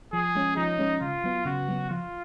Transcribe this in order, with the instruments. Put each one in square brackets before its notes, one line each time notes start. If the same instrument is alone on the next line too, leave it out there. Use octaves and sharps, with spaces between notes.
[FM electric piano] F3 [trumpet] G#4
[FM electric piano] G#3 C#4
[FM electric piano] F3 [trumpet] D#4
[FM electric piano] G#3 C#4
[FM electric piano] C#3 [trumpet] F4
[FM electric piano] F#3 B3
[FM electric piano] C#3 [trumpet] F#4
[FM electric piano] F#3 B3
[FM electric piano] F3 [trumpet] F4